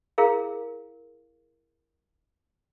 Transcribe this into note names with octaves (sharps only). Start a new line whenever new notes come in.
E4 G#4 A#4 F5